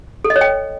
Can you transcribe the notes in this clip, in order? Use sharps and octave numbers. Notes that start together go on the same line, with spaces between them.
A4
D#5
C#5
G5